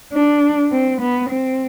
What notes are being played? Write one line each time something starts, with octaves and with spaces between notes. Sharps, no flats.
D4
C4
B3
C4